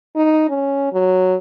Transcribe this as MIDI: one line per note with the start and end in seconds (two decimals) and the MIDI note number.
0.16 0.48 63
0.49 0.92 61
0.92 1.35 54